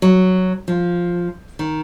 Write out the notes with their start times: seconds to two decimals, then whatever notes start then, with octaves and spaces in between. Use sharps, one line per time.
0.02 F#3
0.68 F3
1.59 D#3